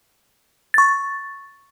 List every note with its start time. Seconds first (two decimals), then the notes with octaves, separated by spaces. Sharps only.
0.74 C#6 A6